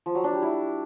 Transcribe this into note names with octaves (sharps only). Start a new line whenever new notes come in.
F3
F#3
D4
G3
E4